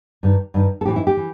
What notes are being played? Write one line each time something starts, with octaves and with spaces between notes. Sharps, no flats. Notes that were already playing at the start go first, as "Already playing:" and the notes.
G2 D#3
G2 D#3
A4
A2 E3 G4
E4
G4
E3